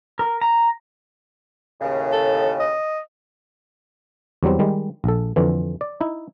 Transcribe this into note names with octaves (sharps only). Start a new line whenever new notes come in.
A#4
A#5
D#2 A2 C#3
A4
D#5
E2 F#3 G3 C4
D#3 G3 G#3
A#1 A4
F2 D3 E3
D5
D#4 E4